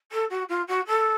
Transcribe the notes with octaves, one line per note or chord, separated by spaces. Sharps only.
A4
F#4
F4
F#4
A4